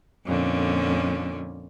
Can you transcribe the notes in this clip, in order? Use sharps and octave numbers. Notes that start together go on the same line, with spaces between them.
F2 A#2 D3 C#4